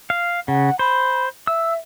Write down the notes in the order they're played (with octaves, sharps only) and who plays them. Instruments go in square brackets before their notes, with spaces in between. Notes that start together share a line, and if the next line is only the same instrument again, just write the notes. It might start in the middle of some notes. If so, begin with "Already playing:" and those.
[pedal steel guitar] F5
[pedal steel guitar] C#3 [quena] F#5
[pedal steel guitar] C5 [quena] B5
[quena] E5 [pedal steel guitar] E6